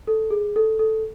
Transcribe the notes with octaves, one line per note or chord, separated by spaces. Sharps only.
A4
G#4
A4
A4